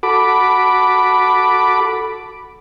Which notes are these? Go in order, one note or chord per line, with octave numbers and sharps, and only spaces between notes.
F#4 A4 B5 D6